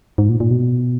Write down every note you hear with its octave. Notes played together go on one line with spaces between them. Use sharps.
G#2
A#2
A#2
B2